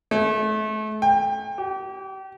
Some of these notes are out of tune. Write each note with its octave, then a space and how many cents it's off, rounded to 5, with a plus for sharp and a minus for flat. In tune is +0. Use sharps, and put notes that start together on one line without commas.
A3 -35
G5 +25
G4 -35